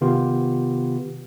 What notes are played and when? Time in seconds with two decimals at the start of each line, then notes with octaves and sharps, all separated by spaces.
0.01 C3 D#3 B3 F4 G4 B4